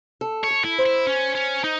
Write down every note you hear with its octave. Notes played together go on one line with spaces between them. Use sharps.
A4
C#5
A4
E4
C5
E4
C#4
C#4
D#4